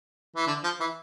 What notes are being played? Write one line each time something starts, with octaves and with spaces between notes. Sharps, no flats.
E3
D3
F3
E3